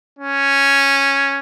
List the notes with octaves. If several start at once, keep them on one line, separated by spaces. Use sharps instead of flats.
C#4